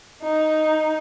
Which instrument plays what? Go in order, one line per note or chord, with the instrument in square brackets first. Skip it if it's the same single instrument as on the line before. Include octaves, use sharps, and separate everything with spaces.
[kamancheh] D#4